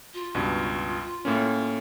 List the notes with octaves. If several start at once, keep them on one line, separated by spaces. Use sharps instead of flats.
F4
C#2 G2 B2
A2 A#3 C#4